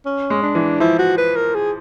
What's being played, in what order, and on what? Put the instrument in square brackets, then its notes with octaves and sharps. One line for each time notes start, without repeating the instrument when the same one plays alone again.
[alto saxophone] C#4
[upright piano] G#3
[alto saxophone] D4
[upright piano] E3
[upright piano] F3 [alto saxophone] E4
[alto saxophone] F#4
B4
A#4
G#4